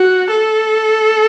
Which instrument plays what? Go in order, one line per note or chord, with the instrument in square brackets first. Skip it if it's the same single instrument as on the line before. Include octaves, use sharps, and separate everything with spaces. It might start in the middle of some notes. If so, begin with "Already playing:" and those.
Already playing: [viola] F#4
A4